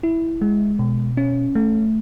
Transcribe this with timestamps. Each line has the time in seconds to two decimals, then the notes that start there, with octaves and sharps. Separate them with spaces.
0.03 E4
0.41 G#3
0.79 B2
1.17 C#4
1.55 A3